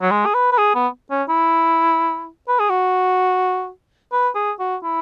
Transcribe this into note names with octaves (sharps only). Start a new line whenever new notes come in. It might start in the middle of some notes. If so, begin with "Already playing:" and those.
F#3
G#3
G#4
B4
B4
G#4
B3
C#4
E4
B4
G#4
F#4
B4
G#4
F#4
E4